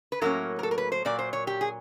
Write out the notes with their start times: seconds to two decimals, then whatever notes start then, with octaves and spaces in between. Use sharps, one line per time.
0.12 B4
0.21 A2 F#3 A#3 C#4 A#4
0.59 A#4
0.63 A4
0.71 A#4
0.78 B4
0.92 C5
1.05 A#2 F#3 A#3 D5
1.19 C5
1.33 C#5
1.47 G4
1.61 G#4